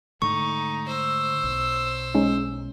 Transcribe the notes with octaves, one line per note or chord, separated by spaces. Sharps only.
G#2 D3 A3 D#4 C#6
C5 E6
B1
G#3 C#4 D#4